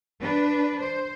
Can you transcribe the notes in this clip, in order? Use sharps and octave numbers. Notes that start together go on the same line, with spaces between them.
D4 B4
C5